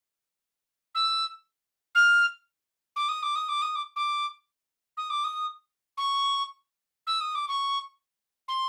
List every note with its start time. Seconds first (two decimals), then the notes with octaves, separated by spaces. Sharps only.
0.95 E6
1.95 F6
2.96 D6
3.09 D#6
3.23 D6
3.36 D#6
3.49 D6
3.62 D#6
3.76 D6
3.96 D6
4.97 D#6
5.10 D6
5.24 D#6
5.98 C#6
7.07 E6
7.21 D#6
7.35 D6
7.48 C#6
8.48 C6